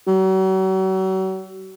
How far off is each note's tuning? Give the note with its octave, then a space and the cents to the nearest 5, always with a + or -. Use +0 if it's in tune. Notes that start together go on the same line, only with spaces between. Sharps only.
F#3 +40